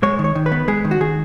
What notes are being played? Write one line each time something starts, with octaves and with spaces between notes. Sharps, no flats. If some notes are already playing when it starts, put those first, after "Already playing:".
G#3 C#5
D#3
C#5
D#3
B4
B3
G#3 G#4
D#3
F#4
D#3 G#4